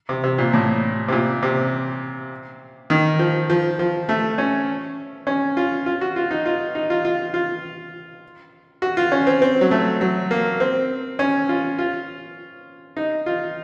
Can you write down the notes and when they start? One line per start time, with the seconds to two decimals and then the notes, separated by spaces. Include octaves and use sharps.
0.09 C3
0.24 C3
0.38 A#2
0.53 A2
1.08 C3
1.12 A#2
1.43 C3
2.90 D#3
3.19 F3
3.50 F3
3.79 F3
4.09 A3
4.38 C#4
5.27 C#4
5.57 F4
5.86 F4
6.01 F#4
6.16 F4
6.31 D#4
6.46 F4
6.75 D#4
6.90 F4
7.05 F4
7.34 F4
8.82 F#4
8.97 F4
9.12 C#4
9.27 C4
9.42 C4
9.61 F#3
9.71 A3
10.01 F#3
10.31 A#3
10.60 C4
11.19 C#4
11.49 F4
11.79 F4
12.97 D#4
13.26 F4